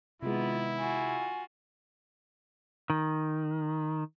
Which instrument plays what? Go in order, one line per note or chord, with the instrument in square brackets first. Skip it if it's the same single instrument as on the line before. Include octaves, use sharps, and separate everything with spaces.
[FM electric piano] C3 G#3 [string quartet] D#3 B3 [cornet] E4 [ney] F4
[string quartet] F4 F#4 [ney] G#5
[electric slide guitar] D#3